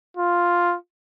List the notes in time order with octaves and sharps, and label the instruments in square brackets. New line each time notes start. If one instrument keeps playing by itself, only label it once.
[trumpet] F4